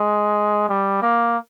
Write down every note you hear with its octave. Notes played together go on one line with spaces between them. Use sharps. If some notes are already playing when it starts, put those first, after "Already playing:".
Already playing: G#3
G3
A#3